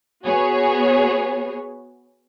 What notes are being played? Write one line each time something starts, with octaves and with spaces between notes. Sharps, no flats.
B3 F#4 G#4 C#5